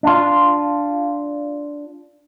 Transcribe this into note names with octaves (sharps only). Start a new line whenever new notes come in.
D4 F4